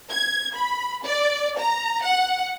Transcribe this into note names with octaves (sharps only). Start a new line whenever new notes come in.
G#6
B5
D5
A#5
F#5